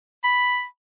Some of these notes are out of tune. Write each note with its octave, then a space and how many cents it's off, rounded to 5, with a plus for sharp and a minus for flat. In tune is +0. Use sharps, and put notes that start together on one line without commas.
B5 +0